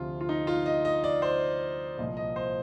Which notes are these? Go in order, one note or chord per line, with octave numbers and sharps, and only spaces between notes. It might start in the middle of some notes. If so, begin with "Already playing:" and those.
Already playing: D2 C3 F3 F4
F4
D#4
F4
D#5
D#5
D5
C5
C2 A#2 F3 D#5
D#5
C5